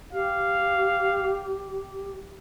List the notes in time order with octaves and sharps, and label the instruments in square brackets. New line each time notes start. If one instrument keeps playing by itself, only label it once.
[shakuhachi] G4 [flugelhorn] F5